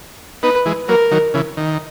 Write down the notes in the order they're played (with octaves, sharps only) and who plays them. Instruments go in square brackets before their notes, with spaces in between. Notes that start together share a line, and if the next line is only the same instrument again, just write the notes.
[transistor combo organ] B3 D#4 [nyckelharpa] B4
[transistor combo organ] E3 G#3
[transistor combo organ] F#3 A#3 [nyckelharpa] A#4
[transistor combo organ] D#3 F#3
C#3 E3
D#3